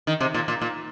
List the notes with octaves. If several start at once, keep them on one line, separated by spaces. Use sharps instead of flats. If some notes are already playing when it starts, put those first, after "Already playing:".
D#3
C3
A#2
A#2
A#2